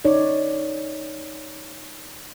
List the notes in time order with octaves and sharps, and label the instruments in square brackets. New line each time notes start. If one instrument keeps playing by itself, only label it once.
[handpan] D#4 C#5 D5